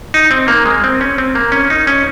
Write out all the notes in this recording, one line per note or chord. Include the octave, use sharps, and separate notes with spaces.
D#4
C4
A#3
G#3
C4
C#4
C4
A#3
C#4
D#4
C#4